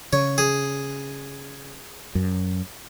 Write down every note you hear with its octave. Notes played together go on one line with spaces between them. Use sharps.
C#3 C#5
G#4
F#2